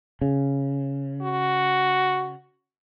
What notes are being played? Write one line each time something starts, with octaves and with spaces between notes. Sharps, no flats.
C#3
F#4